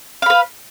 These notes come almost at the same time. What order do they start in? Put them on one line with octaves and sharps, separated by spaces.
F5 B5 B4